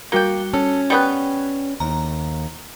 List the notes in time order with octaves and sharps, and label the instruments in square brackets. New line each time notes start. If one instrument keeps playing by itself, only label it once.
[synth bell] G3 F#4 G7 [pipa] A#3 G5
[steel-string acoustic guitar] C#4 [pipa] A4
[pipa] G3 B3 B4 [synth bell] G5 C#6
[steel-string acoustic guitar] D#2 [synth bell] A#5